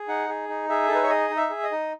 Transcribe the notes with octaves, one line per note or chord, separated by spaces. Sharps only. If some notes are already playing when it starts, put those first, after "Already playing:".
Already playing: G#4
D#4 F#5
G#4
D#4
G#4 E5
A4
D#4 B4
C#5
G#4 D#5
D#4
E5
G#4
D#5
D#4